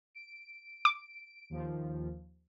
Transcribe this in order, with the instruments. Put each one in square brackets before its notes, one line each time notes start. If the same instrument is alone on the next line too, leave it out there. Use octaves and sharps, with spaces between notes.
[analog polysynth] D7
[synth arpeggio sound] D6
[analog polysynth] D#2 F3